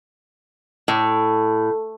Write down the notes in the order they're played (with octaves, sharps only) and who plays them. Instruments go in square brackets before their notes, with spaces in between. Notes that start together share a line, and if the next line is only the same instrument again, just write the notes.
[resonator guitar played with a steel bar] A2